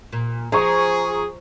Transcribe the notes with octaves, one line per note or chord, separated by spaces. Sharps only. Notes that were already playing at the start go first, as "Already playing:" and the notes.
A#2
F3 G#4 A#5 C#6